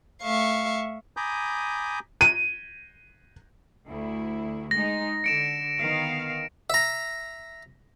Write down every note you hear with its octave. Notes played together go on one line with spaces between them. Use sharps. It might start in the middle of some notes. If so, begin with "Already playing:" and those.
A3 E5 F5 C#6
G#5 A#5 B5 D6 D#6 G6
D#7
D2 E4
G#3 D#4 A#6
D3 C#7 D7 E7
D#3 B3 F5
E5 A#5